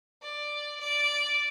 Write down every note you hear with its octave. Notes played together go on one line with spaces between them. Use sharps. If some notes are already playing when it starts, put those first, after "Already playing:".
D5
D5